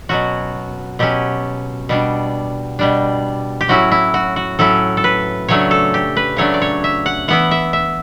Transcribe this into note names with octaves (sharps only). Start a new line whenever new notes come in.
B2 F#3 C#4 F#4
B2 F#3 C#4 G4
B2 G3 D4
B2 G3 D4
G4
A2 F#3 C#4 E4 F#4
E4
F#4
F#4
A2 F#3 C#4 E4 A4
A4
B4
C#3 F#3 A3 D4 C#5
A4
G4
B4
C#3 F#3 A3 D4 C#5
D5
C#5
E5
F#5
E3 B3 E4 F#5
E5
E5